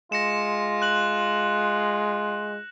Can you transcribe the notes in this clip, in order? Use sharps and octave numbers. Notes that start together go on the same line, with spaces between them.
G#3 F4 A#6 C#7 E7
F#6 F#7